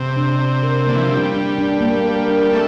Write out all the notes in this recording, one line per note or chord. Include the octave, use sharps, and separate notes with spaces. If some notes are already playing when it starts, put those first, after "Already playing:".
Already playing: C3
D4
D4
A#4
D3 A#3
E3
F3
G3 D4
D4
D4
A#3
A#4
D4
A3 C4